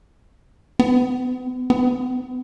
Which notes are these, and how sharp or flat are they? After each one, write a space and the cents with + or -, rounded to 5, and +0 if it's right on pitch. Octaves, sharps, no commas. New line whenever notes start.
B3 +40
B3 +45